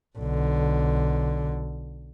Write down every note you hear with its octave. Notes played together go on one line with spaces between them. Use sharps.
B1 D3